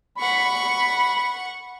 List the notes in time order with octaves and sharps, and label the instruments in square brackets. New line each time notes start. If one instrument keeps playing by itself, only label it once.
[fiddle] F#5 C#6 [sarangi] B5